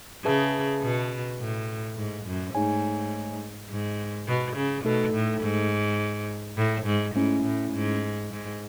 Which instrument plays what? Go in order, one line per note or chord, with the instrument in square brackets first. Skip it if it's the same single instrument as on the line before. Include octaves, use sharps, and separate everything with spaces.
[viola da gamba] C#3 [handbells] G#4 B4 E5 A5
[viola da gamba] B2
A2
G#2
F#2
[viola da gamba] G#2 [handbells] A3 D#4 G#4 C#5 G#5
[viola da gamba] G#2
B2
C#3
[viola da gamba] B2 [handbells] A3 D#4 A4
[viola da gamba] A2
G#2
A2
G#2
[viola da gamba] G#2 [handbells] A3 C#4 E4
[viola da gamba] A2
G#2
G#2